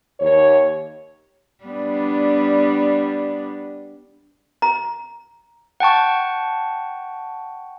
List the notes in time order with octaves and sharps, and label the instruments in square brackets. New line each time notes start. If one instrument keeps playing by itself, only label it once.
[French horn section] D#2 C#5
[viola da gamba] G3 B3 D4
[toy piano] A#5
[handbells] F#5 G5 A5 C#6